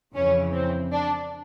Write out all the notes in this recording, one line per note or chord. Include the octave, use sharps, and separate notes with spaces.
F2 C#3 E3 C#4
C4
D4